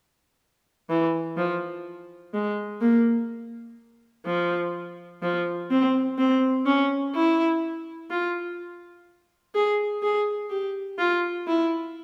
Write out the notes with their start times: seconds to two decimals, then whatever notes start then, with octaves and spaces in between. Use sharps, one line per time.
0.89 E3
1.37 F3
2.34 G#3
2.81 A#3
4.26 F3
5.22 F3
5.71 C4
6.18 C4
6.66 C#4
7.15 E4
8.10 F4
9.55 G#4
10.03 G#4
10.50 G4
10.98 F4
11.48 E4